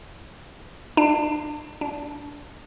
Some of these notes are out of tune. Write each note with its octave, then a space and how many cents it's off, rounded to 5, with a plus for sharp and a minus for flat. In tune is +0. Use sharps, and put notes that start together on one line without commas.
D4 +35
D4 -15